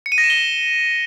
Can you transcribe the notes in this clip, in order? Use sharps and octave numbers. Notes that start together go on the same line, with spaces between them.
C#7
D#7
A#6
E7
G7